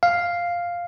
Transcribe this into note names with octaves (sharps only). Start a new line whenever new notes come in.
F5